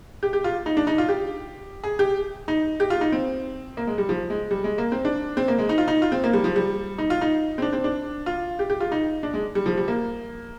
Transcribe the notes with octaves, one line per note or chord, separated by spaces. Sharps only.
G4
G4
F4
D#4
D4
D#4
F4
G4
G#4
G4
D#4
G4
F4
D#4
C4
A#3
G#3
G3
F3
G#3
G3
G#3
A#3
C4
D4
C4
A#3
G#3
D#4
F4
D#4
F4
C4
A#3
G3
F3
G3
D#4
F4
D#4
C4
D4
C4
D4
F4
G4
G4
F4
D#4
D4
G#3
G3
F3
G3
A#3